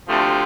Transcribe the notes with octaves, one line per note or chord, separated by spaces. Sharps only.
D2 C3 F3 A3